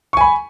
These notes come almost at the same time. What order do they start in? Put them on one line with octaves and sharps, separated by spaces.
C#6 G#5 B5